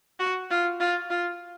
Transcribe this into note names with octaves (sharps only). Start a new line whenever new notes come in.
F#4
F4
F4
F4